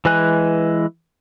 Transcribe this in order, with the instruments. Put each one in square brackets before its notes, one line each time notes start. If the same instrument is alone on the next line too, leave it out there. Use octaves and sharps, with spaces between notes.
[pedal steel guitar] E3 G#3 B4 G#5 F#6